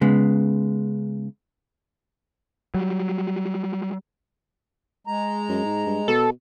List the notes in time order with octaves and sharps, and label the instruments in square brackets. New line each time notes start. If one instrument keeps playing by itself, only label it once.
[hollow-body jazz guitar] C#3 G#3 B3
[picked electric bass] F#3 G3
[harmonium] G#3 A#5
[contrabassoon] F#2
G#2
G2
[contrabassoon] B2 [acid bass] A4